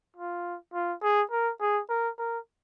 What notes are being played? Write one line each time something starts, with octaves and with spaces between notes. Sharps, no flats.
F4
F4
G#4
A#4
G#4
A#4
A#4